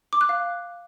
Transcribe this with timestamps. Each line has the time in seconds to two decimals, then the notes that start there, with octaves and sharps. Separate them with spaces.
0.13 D6
0.21 F#6
0.29 F5